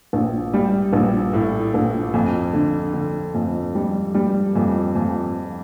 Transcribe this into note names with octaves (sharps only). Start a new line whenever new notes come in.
A#1
G3
A#1
A2
A#1
F2
D3
D3
F2
G3
G3
F2
F2